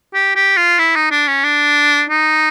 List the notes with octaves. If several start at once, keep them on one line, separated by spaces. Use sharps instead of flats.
G4
G4
F4
E4
D#4
D4
C#4
D4
D#4